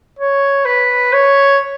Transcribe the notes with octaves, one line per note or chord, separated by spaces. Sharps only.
C#5
B4
C#5